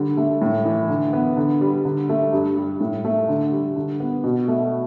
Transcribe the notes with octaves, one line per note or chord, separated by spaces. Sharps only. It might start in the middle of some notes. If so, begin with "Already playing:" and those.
Already playing: D3 G3
A3
A2
E3
D3
B3
D3
G3
D3
A3
G2
G3
A2
A3
D3
G3
D3
B3
B2
A3